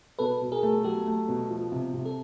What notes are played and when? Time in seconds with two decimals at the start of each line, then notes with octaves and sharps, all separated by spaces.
0.19 B2 A4 B4
0.42 B2
0.52 G#4 A#4
0.63 A3
0.84 F#3 G4 A4
1.07 A3
1.29 B2
1.50 F3
1.72 C3
1.94 C3
2.05 A4